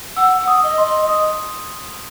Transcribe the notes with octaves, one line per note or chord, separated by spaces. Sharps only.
F#5 E6
F#5
D#6
D#5
C6
D#5
D#5 D#6